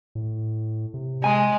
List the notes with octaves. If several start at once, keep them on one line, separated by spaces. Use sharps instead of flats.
A2
C3
G#3 G#5